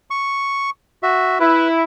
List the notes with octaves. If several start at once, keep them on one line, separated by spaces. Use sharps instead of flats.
C#6
F#4 E5
E4 B4